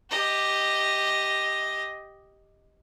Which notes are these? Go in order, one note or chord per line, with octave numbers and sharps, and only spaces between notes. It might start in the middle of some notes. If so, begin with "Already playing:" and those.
G4 D#5